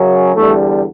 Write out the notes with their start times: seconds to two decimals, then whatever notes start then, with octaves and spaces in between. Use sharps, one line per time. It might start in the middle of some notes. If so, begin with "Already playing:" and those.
Already playing: F#2 C#3 F#3
0.35 E2 D3 G3 A3